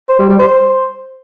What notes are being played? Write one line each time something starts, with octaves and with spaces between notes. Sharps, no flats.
C5
G3
G3
C5